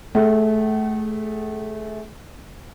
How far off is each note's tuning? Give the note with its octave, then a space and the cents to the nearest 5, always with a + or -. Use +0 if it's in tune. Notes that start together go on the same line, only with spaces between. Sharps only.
A3 -20 G#4 +0 F#5 +40